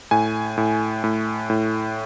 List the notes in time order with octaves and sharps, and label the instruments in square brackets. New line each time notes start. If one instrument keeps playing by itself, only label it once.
[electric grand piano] A2 G#5
A2
A2
A2